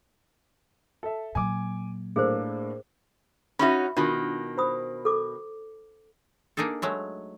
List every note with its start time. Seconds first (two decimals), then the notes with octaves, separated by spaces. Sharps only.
1.03 A4 E5
1.35 A#2 F#3 G#5 D6
2.16 A2 A#3 D4 G#4 A#4 C5
3.59 C#4 D#4 F#4 E5 B5
3.97 B2 D#3 D4 F4 F#4
4.57 C5 B5 D#6
5.05 A4 D6
6.57 A#3 D4 D#4 G#4 A4
6.82 F#3 G#3 A3